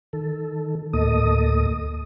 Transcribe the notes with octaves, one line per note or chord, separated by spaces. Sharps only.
D#3 A4
D2 A2 A#3 A4 D#5 D#6